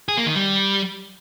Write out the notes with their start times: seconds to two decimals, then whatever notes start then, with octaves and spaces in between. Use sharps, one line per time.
0.08 G#4
0.17 A#3
0.27 D#3
0.36 G3